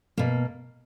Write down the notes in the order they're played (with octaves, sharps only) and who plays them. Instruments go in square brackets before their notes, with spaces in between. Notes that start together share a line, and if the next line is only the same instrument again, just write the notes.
[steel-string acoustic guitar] B2 A#3